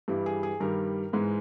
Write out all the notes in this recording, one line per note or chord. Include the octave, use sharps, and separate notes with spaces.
G2 E3 G3
G#4
G#4
G2 D#3 G3 A#4
G#2 E3 G#3